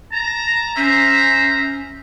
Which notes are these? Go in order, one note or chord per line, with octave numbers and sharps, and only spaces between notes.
A5 A#5
C#4 C5 E5 A#5